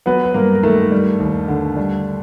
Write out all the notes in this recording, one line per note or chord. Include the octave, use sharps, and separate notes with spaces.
F#3 B3 B4
B4
G2 A#3 A#4
A#4
D#3 A3 A4
G3
D#2
D3
G3